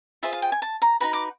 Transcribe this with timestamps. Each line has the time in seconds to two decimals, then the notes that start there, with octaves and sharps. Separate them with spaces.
0.23 F4 G#4 C5 E5
0.32 F5
0.42 G5
0.52 G#5
0.62 A5
0.82 A#5
1.00 D#4 F#4 B4 B5
1.13 D6